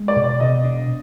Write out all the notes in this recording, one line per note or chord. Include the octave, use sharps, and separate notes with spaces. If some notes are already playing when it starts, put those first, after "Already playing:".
Already playing: G#3
D5
B2
D5
B2 D#5
D4